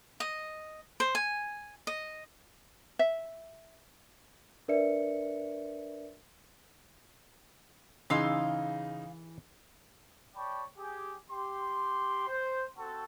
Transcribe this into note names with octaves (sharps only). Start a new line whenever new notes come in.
D#5
C5
G#5
D#5
E5
D4 A#4 B4 D5 E5 C#7
C#3 E3 D#4 G#4 F5 C6 E6
C#5 D5 G5 A5 B5 C#6
G4 G#4
G4 C6
C5
C4 F#4 A4